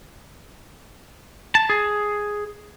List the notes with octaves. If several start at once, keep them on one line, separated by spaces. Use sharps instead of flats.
A5
G#4